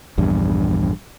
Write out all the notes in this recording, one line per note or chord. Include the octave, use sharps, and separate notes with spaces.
A#1 E2 G2